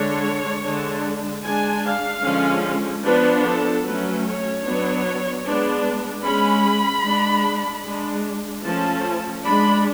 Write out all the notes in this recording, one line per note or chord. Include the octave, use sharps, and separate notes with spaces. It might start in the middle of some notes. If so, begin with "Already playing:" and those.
Already playing: D3 G#3 D4 C#5
D3 G#3 D4
G#3 D4 G#5
F5
D3 F3 G#3 C#4
F3 B3 D4 B4
A4
F#3 A3 C#4 B4
C#5
F#3 B3 D4
G#3 B3 D4
G#3 C#4 B5
G#3 D4
G#3 D4
F3 A3 C#4 A5
G#3 D4 B5